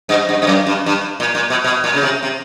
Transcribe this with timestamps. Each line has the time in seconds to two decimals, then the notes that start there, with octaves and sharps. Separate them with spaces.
0.09 G2
0.29 G2
0.42 G2
0.47 F#2
0.67 G2
0.86 G2
1.20 A#2
1.35 A#2
1.50 B2
1.64 B2
1.84 A#2
1.95 C#3
2.03 C3
2.22 C3